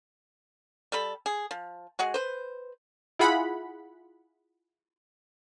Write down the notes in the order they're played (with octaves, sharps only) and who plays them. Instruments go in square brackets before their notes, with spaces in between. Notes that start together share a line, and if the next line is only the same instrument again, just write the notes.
[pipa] G3 A4 B5
G#4
F3
G#3 F#4 G#4
B4 C5
[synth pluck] E4 F4 G#4 F#5 B5